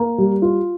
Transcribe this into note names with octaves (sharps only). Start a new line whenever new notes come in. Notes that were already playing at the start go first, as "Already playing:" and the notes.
Already playing: A#3
G3
F4